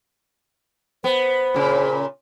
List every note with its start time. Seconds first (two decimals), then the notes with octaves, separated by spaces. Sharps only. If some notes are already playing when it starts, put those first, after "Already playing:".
1.04 B3 C5
1.54 A#2 C#3